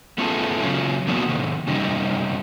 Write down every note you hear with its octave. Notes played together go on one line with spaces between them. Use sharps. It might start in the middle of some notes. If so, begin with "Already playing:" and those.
A3 B3 C#4 F4 G#4 A4
C#3 F#3 C#4 F4
E3 A#3 B3 D4 F#4
C3 D#3
F#2 C3 G3 C#4 D#4